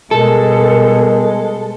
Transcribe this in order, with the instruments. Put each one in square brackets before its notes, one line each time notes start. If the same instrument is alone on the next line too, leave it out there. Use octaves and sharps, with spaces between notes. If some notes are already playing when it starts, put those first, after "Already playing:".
[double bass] B2 G3 [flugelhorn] G#3 [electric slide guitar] A4 [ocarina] A#4